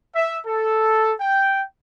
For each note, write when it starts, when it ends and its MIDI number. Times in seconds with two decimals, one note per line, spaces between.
0.15 0.39 76
0.47 1.12 69
1.21 1.62 79